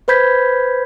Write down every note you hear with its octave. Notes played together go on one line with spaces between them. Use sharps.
B4 C5 B5 G6 G#6 B6